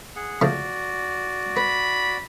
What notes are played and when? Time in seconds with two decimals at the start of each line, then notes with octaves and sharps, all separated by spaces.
0.16 G#4 F#5
0.42 C#3 F3 A3 F#4 D5
1.57 B4 B5